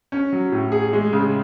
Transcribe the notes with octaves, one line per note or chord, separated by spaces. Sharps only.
C#4
F#3
A2
G#4
G#3
C#3